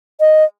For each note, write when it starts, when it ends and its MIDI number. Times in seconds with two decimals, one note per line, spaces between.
0.20 0.44 75